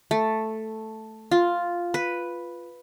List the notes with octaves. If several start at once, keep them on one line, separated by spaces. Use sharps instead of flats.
A3
F4
B4